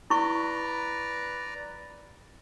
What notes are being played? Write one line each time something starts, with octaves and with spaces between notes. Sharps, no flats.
E4 B4 D5 A#5 C#6